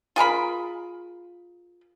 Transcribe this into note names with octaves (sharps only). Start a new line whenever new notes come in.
F4 G#4 A#4 B5